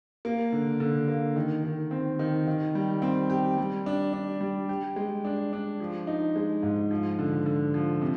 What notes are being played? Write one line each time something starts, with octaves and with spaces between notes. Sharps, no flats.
A#3
D3
D3
A#3
D#3
D#3
C4
D#3
D#3
G3
C4
G4
G3
D4
D4
G3
G4
G#3
D4
D4
F3
D#4
G#3
G#2
F3
D3
D3
F3
C3